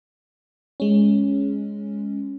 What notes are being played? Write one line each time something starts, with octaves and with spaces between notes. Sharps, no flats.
G#3 C#4